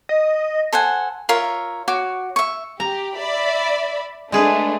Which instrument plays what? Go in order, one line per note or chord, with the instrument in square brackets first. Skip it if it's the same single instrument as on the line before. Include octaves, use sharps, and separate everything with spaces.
[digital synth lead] D#5
[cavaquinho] A4 C5 F#5 G#5
F4 A#4 C#5 E5
F#4 C#5 D6
E5 C#6
[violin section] G4 [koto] A#5
[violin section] D5 E5 B5
[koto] G#3 G#4 B4 [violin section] A3 D4